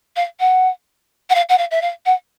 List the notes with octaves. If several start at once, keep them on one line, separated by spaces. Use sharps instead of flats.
F5
F#5
F#5
F5
F#5
F5
E5
F5
F#5